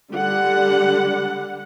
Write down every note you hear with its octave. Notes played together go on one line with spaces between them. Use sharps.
D3 G3 F#5